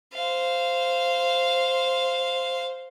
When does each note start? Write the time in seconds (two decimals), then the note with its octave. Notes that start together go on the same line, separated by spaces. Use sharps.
0.14 C5 F5